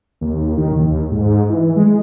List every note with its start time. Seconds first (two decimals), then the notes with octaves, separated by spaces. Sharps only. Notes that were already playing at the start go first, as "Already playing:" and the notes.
0.21 D#2
0.58 D#3
0.72 D#2
1.11 G#2
1.49 E3
1.76 G#3